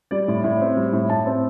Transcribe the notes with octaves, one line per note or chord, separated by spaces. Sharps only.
G3 D5
A2
A2
C4
G3
A2
A2 A5
C4